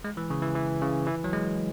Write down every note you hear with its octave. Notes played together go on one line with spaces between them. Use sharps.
G#3
E3
C#3
E3
E3
C#3
E3
F#3
G#3